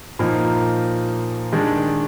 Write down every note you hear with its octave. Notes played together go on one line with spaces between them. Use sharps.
A#2 F3 A#3 D#4
D#3 G#3 D4